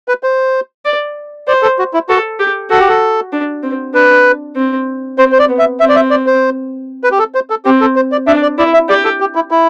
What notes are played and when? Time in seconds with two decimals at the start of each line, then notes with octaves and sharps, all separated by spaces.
0.08 B4
0.23 C5
0.85 D5
1.48 C5 D5
1.62 A4
1.79 F#4
1.94 E4
2.09 F#4 A4
2.39 G4
2.70 F#4 A4
2.80 G4
2.88 A4
3.33 D4
3.63 C4
3.94 D4 B4
4.56 C4
5.18 C4 C5
5.32 C5
5.39 D5
5.48 B3
5.59 E5
5.80 C4 E5
5.89 D5
5.96 E5
6.11 D5
6.27 C5
7.04 B4
7.12 G4
7.19 A4
7.35 C5
7.50 A4
7.65 C4 G4
7.81 A4
7.96 C5
8.12 D5
8.27 D4 E5
8.42 D5
8.58 E4 D5
8.74 E5
8.89 G4 D5
9.04 A4
9.20 G4
9.35 E4
9.51 E4